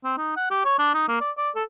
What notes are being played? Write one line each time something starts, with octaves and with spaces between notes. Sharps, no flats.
C4
D#4
F#5
G4
C#5
D4
D#4
A#3
D5
D5
A4